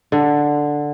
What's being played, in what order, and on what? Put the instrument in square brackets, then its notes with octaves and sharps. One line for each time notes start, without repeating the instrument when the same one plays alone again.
[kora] D3